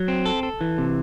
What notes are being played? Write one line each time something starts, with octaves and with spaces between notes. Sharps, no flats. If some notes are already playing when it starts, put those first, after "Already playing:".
Already playing: F#3
C4
A4
A4
E3
C3